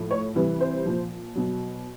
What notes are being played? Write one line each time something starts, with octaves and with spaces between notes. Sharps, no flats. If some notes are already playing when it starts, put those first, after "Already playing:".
Already playing: A2 F3
C#5
C3 E3 G3 B4
C5
A#2 F3
B2 F#3